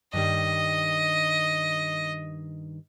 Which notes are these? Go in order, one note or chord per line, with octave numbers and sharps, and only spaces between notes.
G2 D#3 G3 D#5